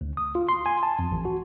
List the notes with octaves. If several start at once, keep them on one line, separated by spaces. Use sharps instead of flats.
D2
D#6
F4
C6
G#5
A5
F2
A1
F#4